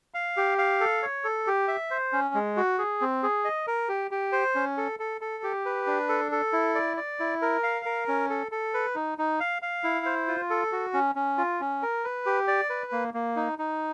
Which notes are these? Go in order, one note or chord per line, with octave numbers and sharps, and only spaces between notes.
F5
G4
F5
A4
C#5
A4
G4
E5
C5
C#4
G#3
F#4
G#4
C4
G#4
D#5
A#4
G4
G4
C5
C#4
A4
A4
A4
G4
B4
D4
A4
A4
E4
D5
D5
E4
A#4
F5
A#4
C#4
A4
A4
B4
D#4
D#4
F5
F5
E4
C5
F4
A4
F#4
C#4
C#4
F4
C#4
A#4
B4
G4
D5
B4
A#3
A#3
D#4
D#4